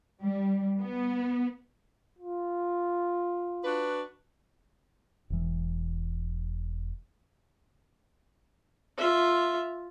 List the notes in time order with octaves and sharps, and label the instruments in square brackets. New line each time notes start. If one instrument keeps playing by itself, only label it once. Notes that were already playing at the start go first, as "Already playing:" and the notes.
[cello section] G3
B3
[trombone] F4
[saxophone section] D4 F#4 B4
[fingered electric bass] E1 E3
[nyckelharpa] F4 E5